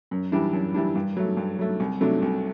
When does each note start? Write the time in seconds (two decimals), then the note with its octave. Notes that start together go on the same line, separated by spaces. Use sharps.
0.11 F#2
0.32 E3 G3 D4
0.53 F#2
0.74 E3 G3 D4
0.95 G2
1.17 F#3 A3
1.37 G2
1.59 F#3 A3
1.80 C2
2.01 C3 F#3 A3 D4
2.22 C2